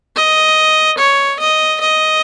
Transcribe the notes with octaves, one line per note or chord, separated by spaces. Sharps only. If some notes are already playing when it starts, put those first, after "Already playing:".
D#5
C#5
D#5
D#5